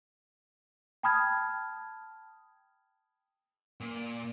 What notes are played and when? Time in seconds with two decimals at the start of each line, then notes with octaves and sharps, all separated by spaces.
1.03 G5 A5 B5 D#6 F6 G#6
3.80 A#2